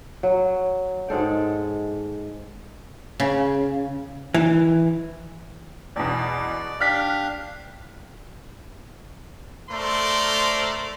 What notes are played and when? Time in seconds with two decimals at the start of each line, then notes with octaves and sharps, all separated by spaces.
0.23 F#3
1.09 G#2 G#3 A4 G5
3.20 C#3
4.34 E3
5.96 E2 B2 D5
6.80 D4 G4 F5 F6 F#6 B6
9.70 A3 A4 A#4 C5 D5 C6